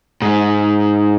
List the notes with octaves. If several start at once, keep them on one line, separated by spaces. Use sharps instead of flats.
G#2